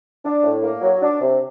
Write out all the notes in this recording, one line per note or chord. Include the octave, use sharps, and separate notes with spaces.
D4
A2
A#3
F#3
D4
C3